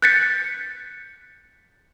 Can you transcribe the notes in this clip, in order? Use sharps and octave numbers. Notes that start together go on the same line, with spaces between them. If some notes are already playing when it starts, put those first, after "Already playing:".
F#6 G6 A6 B6 C#7